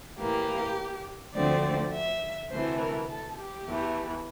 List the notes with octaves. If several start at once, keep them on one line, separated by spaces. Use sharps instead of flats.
A2 E3 A#3 G4
D2 D3 F3 A3 C4 D5
E5
D2 C3 E3 A3 C5
A#4
A4
G4
E2 E3 A3